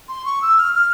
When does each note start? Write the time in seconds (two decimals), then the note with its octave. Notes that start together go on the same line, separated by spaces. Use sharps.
0.08 C6
0.25 C#6
0.41 E6
0.57 F6
0.74 F6